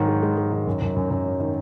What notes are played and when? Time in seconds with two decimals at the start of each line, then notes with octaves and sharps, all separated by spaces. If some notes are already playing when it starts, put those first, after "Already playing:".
Already playing: G#2 D#3 F#3
0.08 G#3
0.23 G#3
0.37 G#3
0.52 D#3
0.67 F#2
0.82 F#2
0.96 F#2
1.11 F#2
1.25 F#3
1.40 D#3